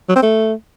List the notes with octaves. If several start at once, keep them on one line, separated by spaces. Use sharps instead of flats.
F#3
C4
A3